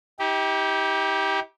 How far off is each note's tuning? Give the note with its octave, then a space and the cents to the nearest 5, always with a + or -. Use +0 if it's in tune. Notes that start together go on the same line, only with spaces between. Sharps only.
D#4 +45 G4 +0